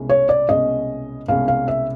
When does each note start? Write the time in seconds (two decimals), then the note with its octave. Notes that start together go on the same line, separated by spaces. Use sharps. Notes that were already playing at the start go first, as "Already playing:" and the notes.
Already playing: C2 B2 G#3 C#4
0.09 C#5
0.29 D5
0.49 C2 B2 G#3 C#4 D#5
1.28 C2 B2 G#3 C#4 F5
1.48 F5
1.68 E5